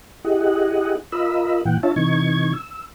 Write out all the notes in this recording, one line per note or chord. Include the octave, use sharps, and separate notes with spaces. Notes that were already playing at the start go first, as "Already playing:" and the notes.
E4 G4 G#4 D#5 F#5
F4 A#4 D#5 B5 E6
A#2 E3 F#5 G5
D4 F4 C#5 E5 A5
C3 E3 D#4 C#6 G#6
E6